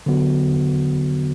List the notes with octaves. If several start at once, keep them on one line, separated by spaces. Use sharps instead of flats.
D3 F#3 B3 F#4